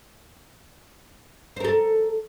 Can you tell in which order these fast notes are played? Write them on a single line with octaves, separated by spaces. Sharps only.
C5 A#4 A4